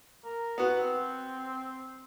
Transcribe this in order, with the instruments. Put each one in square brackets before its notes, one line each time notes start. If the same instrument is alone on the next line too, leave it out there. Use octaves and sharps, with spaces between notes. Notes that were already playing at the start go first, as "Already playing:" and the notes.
[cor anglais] A#4
[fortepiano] B3 F#4
[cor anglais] C4